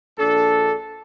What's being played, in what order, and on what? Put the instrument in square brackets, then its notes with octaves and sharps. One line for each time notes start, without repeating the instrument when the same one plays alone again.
[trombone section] A#1 D4 A4